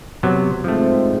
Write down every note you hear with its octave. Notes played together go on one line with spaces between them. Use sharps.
C3 F#3 B3
G#2 F3 A3 C4